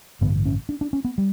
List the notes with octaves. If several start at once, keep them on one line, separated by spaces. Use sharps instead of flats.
A1 G2 D3 B3
C#4
D4
D4
C#4
B3
G3